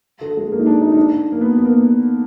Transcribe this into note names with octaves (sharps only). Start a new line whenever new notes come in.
D3
G#3
A#3
D#4
D4
D#4
D#4
D4
A#3
B3
B3
A#3